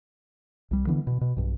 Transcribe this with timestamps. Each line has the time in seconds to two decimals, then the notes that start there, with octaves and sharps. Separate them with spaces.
0.71 C2 G3
0.87 D3 E3 B3
1.07 B2
1.21 B2
1.36 B1 G2